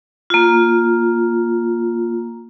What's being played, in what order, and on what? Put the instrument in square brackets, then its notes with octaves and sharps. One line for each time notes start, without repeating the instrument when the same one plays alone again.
[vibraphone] A#3 F4